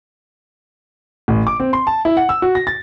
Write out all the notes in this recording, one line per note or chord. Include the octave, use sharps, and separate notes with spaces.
A1
D6
C4
C6
A5
E4
F#5
E6
F#4
A#6
A6